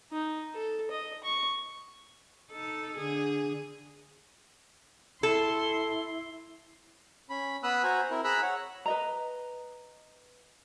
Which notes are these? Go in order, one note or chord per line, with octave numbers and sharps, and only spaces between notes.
D#4
A4
D#5
C#6
D#4 A4
D3 G#4
E4 A4 C6
C#4 B5
B3 B5 D#6 E6 F#6
F#4 C5 G#5 A#5
C4 E4 A#4
G#4 A#5 B5 E6 F#6
C#5 F#5
B4 D#5 A#5